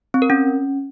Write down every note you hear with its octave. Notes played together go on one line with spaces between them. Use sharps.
C4
A#4
C#4